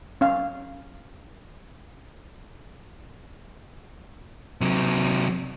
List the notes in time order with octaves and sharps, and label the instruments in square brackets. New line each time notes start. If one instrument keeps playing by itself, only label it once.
[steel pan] C#4 F5
[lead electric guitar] C3 F#3